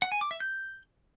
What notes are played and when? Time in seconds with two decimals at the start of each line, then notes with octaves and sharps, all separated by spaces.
0.02 F#5
0.12 G#5
0.21 D6
0.31 E5
0.40 G6